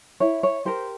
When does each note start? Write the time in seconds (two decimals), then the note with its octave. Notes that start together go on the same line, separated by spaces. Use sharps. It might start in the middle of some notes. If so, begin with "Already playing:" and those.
0.20 E4 C#5
0.43 C#5
0.65 G4 A#4 C5